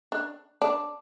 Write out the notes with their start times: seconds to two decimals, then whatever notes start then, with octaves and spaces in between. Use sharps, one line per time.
0.12 D4
0.62 D4